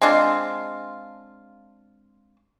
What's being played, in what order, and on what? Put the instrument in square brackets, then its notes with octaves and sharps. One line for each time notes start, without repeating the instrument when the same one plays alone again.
[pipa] G#3 C4 D4 F4